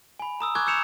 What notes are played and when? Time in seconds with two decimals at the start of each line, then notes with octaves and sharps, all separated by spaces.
0.19 G#5 B5
0.40 A#5 D#6 E6
0.55 G#5 C#6 D6 F#6 G#6
0.67 E6 G6 C#7 E7 F7